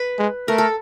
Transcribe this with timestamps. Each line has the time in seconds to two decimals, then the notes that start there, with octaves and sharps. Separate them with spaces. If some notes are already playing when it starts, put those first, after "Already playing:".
Already playing: B4
0.19 G#3
0.48 A3 A#4
0.58 A4